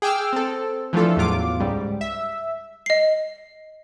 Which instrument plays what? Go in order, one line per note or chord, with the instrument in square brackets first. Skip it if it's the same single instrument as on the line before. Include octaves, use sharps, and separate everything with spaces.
[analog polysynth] G#4 G5 D6 E6 F6
C4 A4
E3 F3 A3 D4 F4 A4
E2 A2 F#3 F4 D6
C#2 G#2 G3
E5
[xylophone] D#5 C7